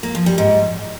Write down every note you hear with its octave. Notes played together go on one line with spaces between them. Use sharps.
A#3
F3
G3
G#2